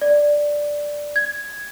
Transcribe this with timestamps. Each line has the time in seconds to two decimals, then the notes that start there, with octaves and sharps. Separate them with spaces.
0.01 D5
1.16 G#6